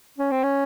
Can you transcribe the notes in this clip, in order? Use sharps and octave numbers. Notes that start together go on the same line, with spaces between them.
C#4
C4
C#4